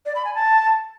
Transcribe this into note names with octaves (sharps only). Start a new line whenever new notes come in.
D5
B5
G#5
A5